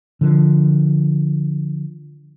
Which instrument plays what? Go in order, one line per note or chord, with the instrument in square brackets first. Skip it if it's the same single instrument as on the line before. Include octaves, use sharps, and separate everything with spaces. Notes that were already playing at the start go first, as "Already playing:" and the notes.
[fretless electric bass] D3 F3